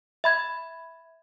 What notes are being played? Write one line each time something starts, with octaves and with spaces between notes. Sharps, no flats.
E5 B5 G#6